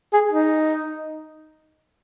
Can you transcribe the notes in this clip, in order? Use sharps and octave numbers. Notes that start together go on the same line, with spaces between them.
G#4
D#4